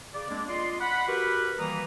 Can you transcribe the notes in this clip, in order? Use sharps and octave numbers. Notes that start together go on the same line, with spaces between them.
C#3 D5
G#3 A#3 C4 D4 D5
F4 D5 D#5 C6
F#5 B5
F#4 G4 A#4 B4
D#3 E3 G3 A#3 A#5 D#6